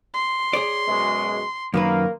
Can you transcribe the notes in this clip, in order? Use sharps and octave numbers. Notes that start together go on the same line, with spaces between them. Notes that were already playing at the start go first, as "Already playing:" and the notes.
C6
G#4 C#5 D5
F#2 B2 G#3
F#2 D#3 A#3 B4